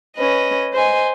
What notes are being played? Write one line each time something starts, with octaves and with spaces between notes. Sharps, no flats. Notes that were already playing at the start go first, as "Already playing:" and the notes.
C#4 B4 D#5
C5 D#5 G#5